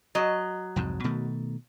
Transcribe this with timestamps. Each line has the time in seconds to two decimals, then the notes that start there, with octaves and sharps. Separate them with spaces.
0.15 F#3 D#5
0.76 C2 F2 G#2
1.04 B2 D#3 A3